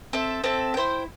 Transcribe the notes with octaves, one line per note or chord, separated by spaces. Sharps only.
C4 A4 E5
C4 A4 E5
E4 C5 G5